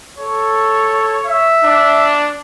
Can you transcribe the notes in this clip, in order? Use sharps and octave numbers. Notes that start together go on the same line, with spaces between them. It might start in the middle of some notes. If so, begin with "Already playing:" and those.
A4 C#5
E5
D4